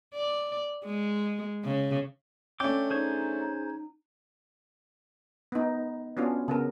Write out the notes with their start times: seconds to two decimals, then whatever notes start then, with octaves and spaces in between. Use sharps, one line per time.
0.14 D5
0.85 G#3
1.64 C#3
2.60 A3 C#4 D4 G5 D6 E6
2.90 D#4 G#4 C5 C#5
5.52 B3 D#4
6.17 B3 C#4 D4 F4 F#4
6.48 C#3 B3 A#4